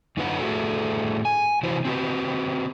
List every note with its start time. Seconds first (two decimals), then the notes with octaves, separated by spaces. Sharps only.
0.17 F#2 D3 D#4 F4 B4 F#5
0.39 A2 A3 C4 F#4 G#4 A4
1.25 G#5
1.63 C3 E3 E4 F#4 B4 C5
1.85 C4 F#4 G4 B4